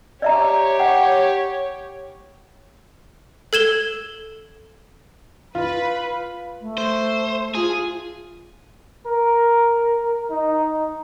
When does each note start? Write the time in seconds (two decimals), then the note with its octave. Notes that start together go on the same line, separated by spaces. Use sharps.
0.22 G4 C#5 D5 E5 A#5
0.80 F#5 G5
3.53 A4 G#6 E7 G7
5.55 F4 B4
6.61 A3
6.78 C5
7.55 F4 G#4
9.06 A#4
10.30 D#4